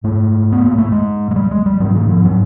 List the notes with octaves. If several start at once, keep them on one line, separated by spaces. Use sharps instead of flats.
G#2 A3
B3
A#3
A3
G#3
G#3
G3
G#3
G3
G#2 F#3
E3
F3
F#3